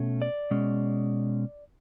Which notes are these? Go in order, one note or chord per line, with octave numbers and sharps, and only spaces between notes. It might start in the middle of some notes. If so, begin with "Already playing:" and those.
Already playing: B2 A3 C#4
D5
B2 G#3 C#4